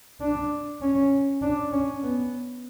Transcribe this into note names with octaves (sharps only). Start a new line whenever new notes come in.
D4
C#4
D4
C#4
B3